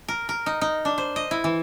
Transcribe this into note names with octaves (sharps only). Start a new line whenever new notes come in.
A#4
A#4
D#4
D#4
D4
C5
D#5
E4
E3